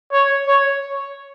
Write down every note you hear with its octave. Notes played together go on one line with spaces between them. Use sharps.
C#5
C#5